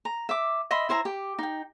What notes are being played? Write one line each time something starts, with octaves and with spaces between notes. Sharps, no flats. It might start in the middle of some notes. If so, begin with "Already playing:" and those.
A#5
E5 D6
D#5 E5 B5 C6
E4 C5 E5 A#5
G4
D#4 G5